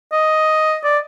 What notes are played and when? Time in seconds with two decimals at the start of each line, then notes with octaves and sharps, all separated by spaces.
0.12 D#5
0.84 D5